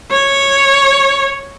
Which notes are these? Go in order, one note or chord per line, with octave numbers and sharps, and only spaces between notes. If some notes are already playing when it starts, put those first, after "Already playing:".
C#5